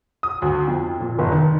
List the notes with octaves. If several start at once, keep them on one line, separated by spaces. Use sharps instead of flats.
D#6
D2
F2
A#2
F1
D#3